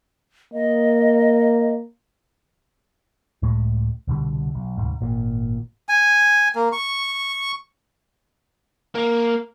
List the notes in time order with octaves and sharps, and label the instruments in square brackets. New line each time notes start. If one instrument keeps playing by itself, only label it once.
[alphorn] A#3 [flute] D#5
[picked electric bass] C#2 A2 G#3
C2 B2 D3 G3
B1
D1 G1 C2 G#2
G#1 A#2
[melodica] G#5
A#3
C#6
[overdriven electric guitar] A#3